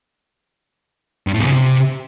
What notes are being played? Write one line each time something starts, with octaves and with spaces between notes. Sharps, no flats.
G2
A2
E2
C#3
C3